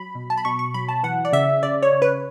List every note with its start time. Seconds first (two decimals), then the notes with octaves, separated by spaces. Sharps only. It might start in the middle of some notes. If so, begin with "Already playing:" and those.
Already playing: F#3 B5
0.15 B2
0.30 A5
0.37 B5
0.45 B2 C#6
0.59 C#6
0.74 F#3 B5
0.89 A5
1.03 E3 F#5
1.25 D5
1.33 C#3 E5
1.63 C#3 D5
1.83 C#5
1.93 C#3
2.02 B4